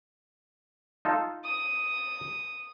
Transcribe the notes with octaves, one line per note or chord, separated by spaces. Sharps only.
D#4 F4 A4
D#6